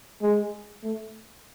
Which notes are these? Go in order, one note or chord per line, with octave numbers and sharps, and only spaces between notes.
G#3
A3